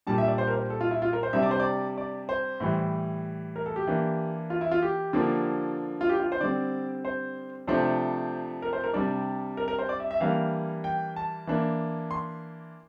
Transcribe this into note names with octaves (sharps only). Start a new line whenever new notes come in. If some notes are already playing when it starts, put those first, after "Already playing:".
A#2 G3 D4 A5
E5
D5
C5
A#4
C5
A4
F4
E4
F4
A#4
C5
C3 G3 D4 E5
D5
C5
D5
D5
C5
A2 E3 G3
A#4
A4
G4
E3 A#3 D4
F4
E4
F4
G4
D3 F3 A#3 D4
F4
G4
F4
C5
D3 G3 C4 D5
C5
C3 F3 A3 D4 C5
A#4
C5
A#4
C3 G3 D4 D5
A#4
A#4
C5
D5
E5
E5
E3 G3 A#3 D4 F5
G5
A5
E3 A#3 D4
C6